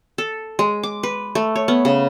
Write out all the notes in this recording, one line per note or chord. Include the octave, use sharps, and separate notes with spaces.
A4
G#3
D6
B4
A3
C#5
B3
C#3